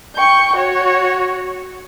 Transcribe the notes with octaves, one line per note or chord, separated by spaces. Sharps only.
G5 C#6
F#4 C#5